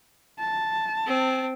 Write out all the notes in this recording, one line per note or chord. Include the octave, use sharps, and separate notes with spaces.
A5
C4